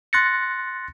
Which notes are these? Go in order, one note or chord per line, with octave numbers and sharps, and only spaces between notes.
C6 F#6 A6 A#6 C#7